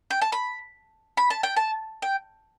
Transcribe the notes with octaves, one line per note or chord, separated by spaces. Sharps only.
G5
A5
B5
B5
A5
G5
A5
G5